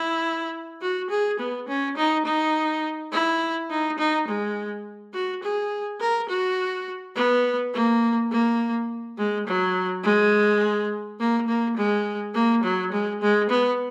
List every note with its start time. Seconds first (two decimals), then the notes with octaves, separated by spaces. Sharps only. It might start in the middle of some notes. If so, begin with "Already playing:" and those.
Already playing: E4
0.81 F#4
1.10 G#4
1.39 B3
1.67 C#4
1.96 D#4
2.25 D#4
3.11 E4
3.70 D#4
3.98 D#4
4.27 G#3
5.13 F#4
5.42 G#4
6.00 A#4
6.29 F#4
7.15 B3
7.73 A#3
8.31 A#3
9.17 G#3
9.46 F#3
10.03 G#3
11.19 A#3
11.47 A#3
11.76 G#3
12.34 A#3
12.63 F#3
12.92 G#3
13.21 G#3
13.49 B3